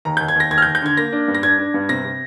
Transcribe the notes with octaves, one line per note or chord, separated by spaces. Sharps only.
D#2 A#5
G6
D#2
G#6
D#2 A#6
D#2 G#6
F6
G6
D#2
G6
D3 G#6
A#3 A#6
D4
G2
A#6
D4 G#6
D4
G2
C3 A#6
C3